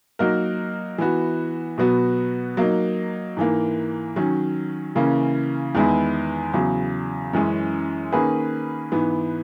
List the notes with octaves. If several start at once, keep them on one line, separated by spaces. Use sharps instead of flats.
F#3 A#3 D#4 F#4 A#4
E3 B3 F#4
B2 F#3 B3 F#4
F#3 A#3 D#4
G#2 E3 A#3
D#3 F#3 C#4
C#3 E3 A#3 C#4
E2 D#3 G#3 B3 E4
E2 C#3 F#3
F#2 E3 G#3 C#4
D#3 A#3 C#4 G#4 B4
G#2 E3 B3